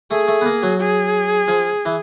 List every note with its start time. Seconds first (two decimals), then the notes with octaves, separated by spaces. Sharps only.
0.11 A3 G#4
0.28 A3
0.41 B3
0.45 A#3
0.63 F#3
0.80 G#4
1.48 F3
1.86 E3